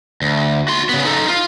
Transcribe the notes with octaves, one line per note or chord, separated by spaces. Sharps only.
D2
F#4 C6
C#3 B3
D#4 A4
F4